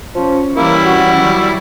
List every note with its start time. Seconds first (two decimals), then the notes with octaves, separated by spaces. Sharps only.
0.15 F3 C#4
0.56 E3 G3 A#3 C#4 E4
0.85 F#4
1.18 D#3 F#3